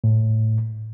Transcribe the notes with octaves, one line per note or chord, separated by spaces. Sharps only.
A2